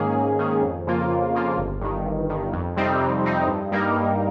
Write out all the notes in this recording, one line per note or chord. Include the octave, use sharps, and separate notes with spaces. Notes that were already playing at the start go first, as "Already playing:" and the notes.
Already playing: G#2 D#3 A#3 C#4 G#4
G#2
D#3 A#3 C#4 G#4
F2
C#3 F3 A#3 F4
F2
C#3 F3 A#3 F4
G1
G2 D#3
G1
G2 D#3
F2
C3 G3 C4 D#4
F2
C3 G3 C4 D#4
G2
G3 A#3 D#4 A#4
G2